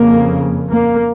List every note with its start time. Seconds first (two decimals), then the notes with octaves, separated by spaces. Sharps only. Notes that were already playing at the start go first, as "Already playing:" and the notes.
Already playing: F2 C#3 A#3
0.71 A#3